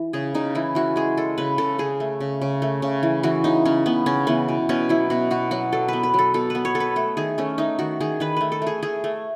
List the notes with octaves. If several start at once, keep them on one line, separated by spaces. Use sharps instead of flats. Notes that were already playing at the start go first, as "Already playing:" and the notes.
Already playing: E3
C#3 G#4
C#3 D#4
E3 E4
E3 F#4
G#3 G#4
G#3 A4
C#3 B4
C#3 A4
C#3 G#4
A3
C#3
C#3
A3
C#3
E3
E3 F#4
C#3 D#4
C#3 C#4
C#3 B3
C#3 C#4
E3 B3
B2
B2 C#4
F#3 E4
B2 F#4
B2 F#4
F#3 F#4
F#3 A4
B3 B4
B4
F#3 A4
B2 A4
B3 B4
C#5
B3 A4
B4
A3 A4
D#3 G#4
A3 C#4
A3 D#4
D#3 F#4
D#3 G#4
D#3 B4
A3 B4
A4
A3 G#4
A3 G#4
A3